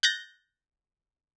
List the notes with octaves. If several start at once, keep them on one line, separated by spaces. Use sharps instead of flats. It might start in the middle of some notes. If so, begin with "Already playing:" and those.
F#6 G6 A6 A#6